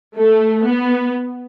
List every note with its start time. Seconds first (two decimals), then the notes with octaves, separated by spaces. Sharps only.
0.16 A3
0.66 B3